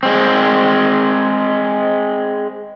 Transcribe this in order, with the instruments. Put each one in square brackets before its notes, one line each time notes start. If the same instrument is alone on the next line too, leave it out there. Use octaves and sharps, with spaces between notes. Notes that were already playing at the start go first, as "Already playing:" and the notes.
[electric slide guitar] G#3 C4